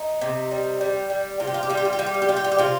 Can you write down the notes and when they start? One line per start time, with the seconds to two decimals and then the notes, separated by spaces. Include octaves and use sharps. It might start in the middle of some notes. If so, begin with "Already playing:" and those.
Already playing: D#4
0.21 C3
0.51 G3
0.81 G3
1.10 G3
1.40 C3 F4
1.47 G4
1.54 F4
1.63 G4
1.70 G3 F4
1.77 G4
1.85 F4
1.93 G4
1.99 G3 F4
2.06 G4
2.14 F4
2.22 G4
2.29 G3 F4
2.37 G4
2.44 F4
2.52 G4
2.58 C3 F4